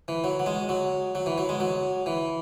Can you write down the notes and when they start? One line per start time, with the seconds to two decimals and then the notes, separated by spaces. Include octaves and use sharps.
0.08 E3
0.24 F#3
0.39 F#3
0.46 G#3
0.69 F#3
1.15 F#3
1.26 E3
1.38 F#3
1.49 G#3
1.60 F#3
2.06 E3